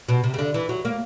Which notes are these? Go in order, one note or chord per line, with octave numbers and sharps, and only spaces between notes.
B2
C3
C#3
D3
E3
F#3
A#3